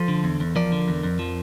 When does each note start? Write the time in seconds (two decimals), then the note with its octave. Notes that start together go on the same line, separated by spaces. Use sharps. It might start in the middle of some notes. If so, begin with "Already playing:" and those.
Already playing: F3 A4 C5
0.08 D3
0.24 E2
0.40 E2
0.56 F3 A#4 D5
0.72 D3
0.88 E2
1.03 F2
1.19 F3